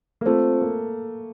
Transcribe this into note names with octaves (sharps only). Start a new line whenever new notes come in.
A#3
A3 C4 F4 C5
A#3